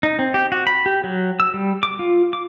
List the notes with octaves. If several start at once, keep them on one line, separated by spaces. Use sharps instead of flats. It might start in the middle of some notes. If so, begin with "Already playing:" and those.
D#4
C4
G4
F#4
B5
G4
F#3
E6
G3
D6
F4
D6